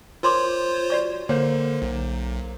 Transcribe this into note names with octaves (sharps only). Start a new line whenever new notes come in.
F4 A#4 C5 C#5 C6 D6
F#4 D5 C#6
D3 A#3 C5 C#5
B1